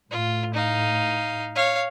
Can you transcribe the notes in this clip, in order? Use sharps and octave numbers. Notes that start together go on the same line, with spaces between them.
A2 F4
D#4 F5
C#5 F5